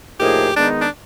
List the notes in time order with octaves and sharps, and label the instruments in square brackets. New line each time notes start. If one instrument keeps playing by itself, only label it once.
[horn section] A2 F3 A#3 D#4 G#4 [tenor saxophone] G4
[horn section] D#3 G#3 B3 D#4 [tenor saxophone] D4
[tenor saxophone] D4